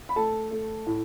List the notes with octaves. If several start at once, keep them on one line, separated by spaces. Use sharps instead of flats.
B5
A3 A4 A5
A3
A2